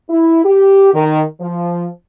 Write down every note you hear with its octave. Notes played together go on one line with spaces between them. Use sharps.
E4
G4
D#3
F3